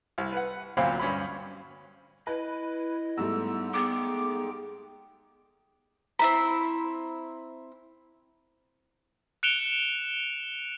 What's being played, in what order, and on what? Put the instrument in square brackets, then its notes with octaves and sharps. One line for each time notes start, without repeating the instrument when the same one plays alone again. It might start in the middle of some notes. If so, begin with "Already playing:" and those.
[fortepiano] C2
B4 F#5
D2 A#2 F#3 C4 F5 B5
G2 C#4 B5
[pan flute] E4 [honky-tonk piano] B4 [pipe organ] D#5
[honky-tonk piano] G#2 G3 A3 [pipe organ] B3 [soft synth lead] E6
[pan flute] B3 [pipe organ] G#4 G5 [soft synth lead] D6
[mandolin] C4 E4 B5 [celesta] A#5
[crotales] F#6 C#7 D7 E7 F7 G7